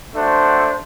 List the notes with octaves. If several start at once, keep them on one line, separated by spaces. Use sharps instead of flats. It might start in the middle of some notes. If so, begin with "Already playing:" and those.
A3 D4 F#4 C5